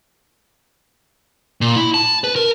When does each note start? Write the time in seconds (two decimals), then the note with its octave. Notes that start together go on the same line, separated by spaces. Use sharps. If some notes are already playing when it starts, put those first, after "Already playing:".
1.61 A#2
1.76 E4
1.94 A5
2.24 B4
2.36 A#4